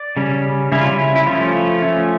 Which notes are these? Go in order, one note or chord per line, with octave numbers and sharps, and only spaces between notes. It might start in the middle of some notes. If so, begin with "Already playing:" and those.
Already playing: D5
C#3 G3 C#4
C#3 G3 C#4 E4
F4
E4
E4
F3 A3 C#4 F4
F3 A3 C#4